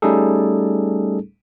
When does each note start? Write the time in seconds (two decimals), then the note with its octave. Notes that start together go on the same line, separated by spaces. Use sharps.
0.02 G3 A3 C#4 D#4 G#4 A4